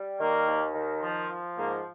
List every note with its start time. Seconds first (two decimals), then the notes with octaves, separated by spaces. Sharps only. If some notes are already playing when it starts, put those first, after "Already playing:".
Already playing: G3
0.19 D#3 A#3
0.46 D#2
0.74 D#3
1.02 F3
1.30 F3
1.56 G#2 A#3